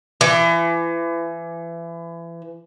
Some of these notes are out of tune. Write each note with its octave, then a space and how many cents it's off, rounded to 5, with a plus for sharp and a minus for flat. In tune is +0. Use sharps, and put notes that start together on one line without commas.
E3 +30